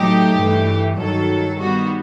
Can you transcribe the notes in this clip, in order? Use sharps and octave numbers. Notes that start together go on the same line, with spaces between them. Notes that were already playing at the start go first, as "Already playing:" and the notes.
Already playing: A2 F#3 A3 D#4 G4
G2 E3 A3
G2 D#3 F#3 A4
D#3 G3 B3 F#4